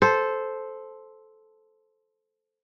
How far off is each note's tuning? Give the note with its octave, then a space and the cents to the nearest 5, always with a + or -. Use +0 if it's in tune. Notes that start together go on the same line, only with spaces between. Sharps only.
A4 -10 C5 +0